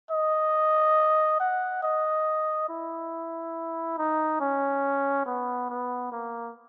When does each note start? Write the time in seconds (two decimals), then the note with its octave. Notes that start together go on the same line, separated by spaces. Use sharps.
0.11 D#5
1.40 F#5
1.83 D#5
2.69 E4
3.98 D#4
4.41 C#4
5.26 B3
5.70 B3
6.12 A#3